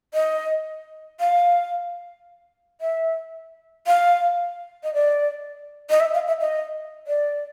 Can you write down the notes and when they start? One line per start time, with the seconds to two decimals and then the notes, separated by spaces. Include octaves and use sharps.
0.14 D#5
1.20 F5
2.81 E5
3.87 F5
4.84 D#5
4.94 D5
5.90 D#5
6.00 E5
6.14 F5
6.28 E5
6.41 D#5
7.07 D5